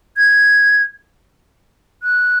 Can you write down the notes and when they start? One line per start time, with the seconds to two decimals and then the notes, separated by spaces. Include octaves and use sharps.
0.18 G#6
2.03 F#6